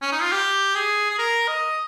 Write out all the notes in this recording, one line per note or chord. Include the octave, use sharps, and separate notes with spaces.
C#4
D#4
F4
G4
G#4
G#4
A#4
D#5